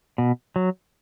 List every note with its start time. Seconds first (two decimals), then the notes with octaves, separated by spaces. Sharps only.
0.18 B2
0.56 F#3